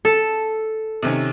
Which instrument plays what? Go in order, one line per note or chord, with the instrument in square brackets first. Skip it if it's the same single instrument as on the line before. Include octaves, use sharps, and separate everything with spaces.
[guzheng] A4
[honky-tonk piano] C3 D#3 C#4